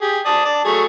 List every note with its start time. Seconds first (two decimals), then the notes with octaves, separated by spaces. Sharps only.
0.02 G4 G#4
0.26 D5 A5 D#6
0.45 D5 A5
0.65 F#3 A3 G#4